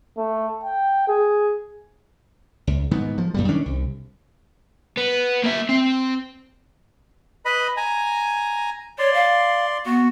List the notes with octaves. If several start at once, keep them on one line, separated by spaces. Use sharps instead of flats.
A3
G5
G#4
C#2
G#2 D#3 B3
F3
F#2 A#2 G3
D#3 C#4 D4
C2
B3
A#3 E5
C4
B4 D#5 B5
G#5 A#5
C#5 D5 C6
F5
B3 F#4